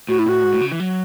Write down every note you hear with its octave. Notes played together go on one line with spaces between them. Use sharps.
A2 F#4
E4
A2 F#4
G#2
A2
C#3
E3
F#3